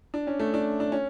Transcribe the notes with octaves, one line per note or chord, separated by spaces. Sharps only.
D4
C#4
A3
D4
D4
C#4